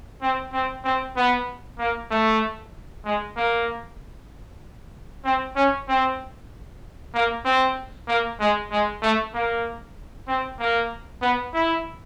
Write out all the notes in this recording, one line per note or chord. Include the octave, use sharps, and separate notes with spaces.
C4
C4
C4
B3
A#3
A3
G#3
A#3
C4
C#4
C4
A#3
C4
A#3
G#3
G#3
A3
A#3
C4
A#3
B3
E4